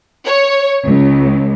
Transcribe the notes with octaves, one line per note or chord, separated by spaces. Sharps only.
C#5
C#2